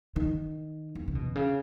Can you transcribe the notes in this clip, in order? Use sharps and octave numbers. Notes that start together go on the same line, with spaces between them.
D#3
E2
C#3
B2
C#3